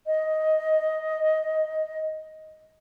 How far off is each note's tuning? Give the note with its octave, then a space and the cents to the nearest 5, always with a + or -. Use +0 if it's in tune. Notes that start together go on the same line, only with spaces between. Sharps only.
D#5 +10